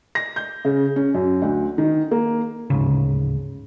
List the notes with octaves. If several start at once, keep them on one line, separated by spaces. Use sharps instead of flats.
A#6
G6
C#3
C#4
F#2
D2
D#3
A#3
D1 G#2 C#3